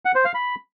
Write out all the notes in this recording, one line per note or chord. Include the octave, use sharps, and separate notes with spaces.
F#5
C5
F5
B5